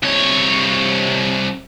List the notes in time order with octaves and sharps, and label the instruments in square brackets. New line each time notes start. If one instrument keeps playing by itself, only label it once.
[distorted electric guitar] C2 C#5